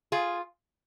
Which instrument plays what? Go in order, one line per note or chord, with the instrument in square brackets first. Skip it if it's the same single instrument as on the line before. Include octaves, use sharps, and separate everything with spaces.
[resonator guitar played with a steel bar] F4 G#4